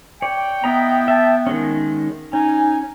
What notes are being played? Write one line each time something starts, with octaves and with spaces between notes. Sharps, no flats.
C#5 D5 G5
B3 E4 D#5 A#5
E5 A5
D#3 G#3 C#4
C#4 D#4 G#5